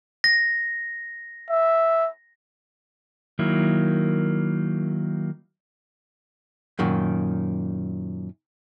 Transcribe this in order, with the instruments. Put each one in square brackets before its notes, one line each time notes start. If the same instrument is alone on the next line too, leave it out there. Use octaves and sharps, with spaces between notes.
[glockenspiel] A#6
[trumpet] E5
[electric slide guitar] D#3 F#3 A#3 E4
[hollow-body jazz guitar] F#2 A#2 D#3